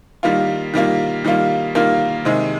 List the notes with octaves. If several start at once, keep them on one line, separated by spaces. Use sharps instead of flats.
D#3 G3 A#3 F4
D#3 G3 A#3 F4
D#3 G3 A#3 F4
D#3 G3 A#3 F4
C3 D#3 G#3